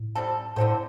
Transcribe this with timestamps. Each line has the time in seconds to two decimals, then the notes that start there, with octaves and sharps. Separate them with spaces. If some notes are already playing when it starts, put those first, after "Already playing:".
Already playing: A2
0.15 G3 C4 A4
0.56 A2 D3 C4 A4 C5